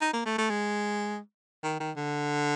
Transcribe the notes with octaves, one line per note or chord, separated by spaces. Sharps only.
D#4
A#3
A3
A3
G#3
D#3
D#3
D3